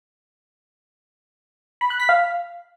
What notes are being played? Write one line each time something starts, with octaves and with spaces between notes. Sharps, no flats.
B5
F#6
B6
F5